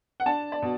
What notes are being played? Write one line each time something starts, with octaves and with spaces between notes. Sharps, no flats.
F#5
D4 A5
D5
B2